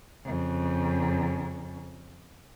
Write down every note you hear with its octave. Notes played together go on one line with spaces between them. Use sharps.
F2 C#3